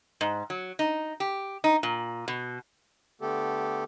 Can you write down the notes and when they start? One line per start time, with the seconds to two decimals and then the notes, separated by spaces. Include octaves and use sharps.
0.21 G#2
0.50 F#3
0.79 D#4
1.20 G4
1.64 D#4
1.83 A#2
2.28 B2
3.21 D3 A3 B3 G4 A4